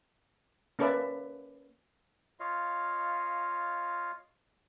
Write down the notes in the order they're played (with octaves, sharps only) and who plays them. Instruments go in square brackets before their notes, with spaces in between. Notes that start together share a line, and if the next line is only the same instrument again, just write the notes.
[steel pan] A#3 C#4 A4 B4 D5 E5
[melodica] F4 C#5 D#5 F5